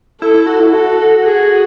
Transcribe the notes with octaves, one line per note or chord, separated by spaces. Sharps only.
E4 A4
E4
F#4
E4
F#4 A4
G#4